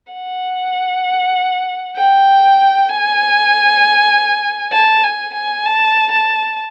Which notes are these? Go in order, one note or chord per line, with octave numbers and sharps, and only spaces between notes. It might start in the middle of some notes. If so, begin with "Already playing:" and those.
F#5
G5
G#5
A5
G#5
G#5
A5
A5